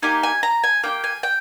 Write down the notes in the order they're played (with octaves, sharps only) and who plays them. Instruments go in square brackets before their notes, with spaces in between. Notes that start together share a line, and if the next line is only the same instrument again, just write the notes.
[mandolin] A#3 D#4 G4 G#5
G#5
A#5
G#5
A#3 D#4 G4 G5
G#5
G5